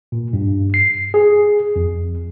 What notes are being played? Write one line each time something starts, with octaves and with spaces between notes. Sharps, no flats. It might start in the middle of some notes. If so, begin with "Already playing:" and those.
A#2
G2
C7
G#4
F2